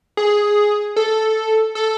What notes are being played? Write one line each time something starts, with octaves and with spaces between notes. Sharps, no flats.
G#4
A4
A4